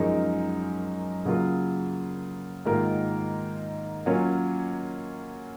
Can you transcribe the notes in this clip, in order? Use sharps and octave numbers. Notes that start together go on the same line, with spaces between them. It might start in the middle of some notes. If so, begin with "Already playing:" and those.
Already playing: F#2 F3 G#3 D#4 A#4
C#3 F#3 A#3 F4
G#2 D#3 A#3 F4 A#4
F#3 A#3 C#4 F4